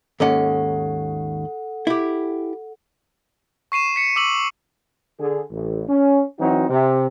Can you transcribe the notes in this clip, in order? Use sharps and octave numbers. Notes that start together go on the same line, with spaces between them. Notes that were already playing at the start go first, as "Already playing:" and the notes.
D#2 G#2 C#4 A4 F#5
E4 G4
C#6 C7 D#7 E7
B6 C#7
D6 E6 D#7 F#7
D3 G#4
A1
C#4
E3 F#3 C4 D#4 F#4
C3